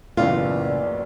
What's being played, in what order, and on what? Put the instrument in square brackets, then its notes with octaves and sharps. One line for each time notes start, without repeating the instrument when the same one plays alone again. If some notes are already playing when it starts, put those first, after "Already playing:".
[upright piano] F#1 B1 E3 [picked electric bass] A2 C#3 [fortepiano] F4 [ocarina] D5